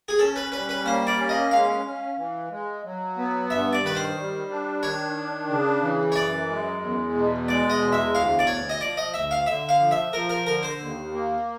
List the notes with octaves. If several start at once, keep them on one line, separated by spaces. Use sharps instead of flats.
G#4
C#4 A4
B4
G3 B4
B4
A#3 C5
D5
C#4
D#5
G#3 F5
C#4
E3
G#3
F#3
B3
G2 E5
D5
D#3 B4
C5
G3
D4
D#3 C#5
D4
C#3
E3
C#5
F#2 D5
G#3
E2
B2
G#3 D5
D#5
E2
E5
D2 F5
D5
D2 C#5
D#5
F3 D5
D#5
D2 E5
F5
D3 E5
F5
F3
E5
F3 A#4
A#4
D3 A#4
C5
D#2
A#3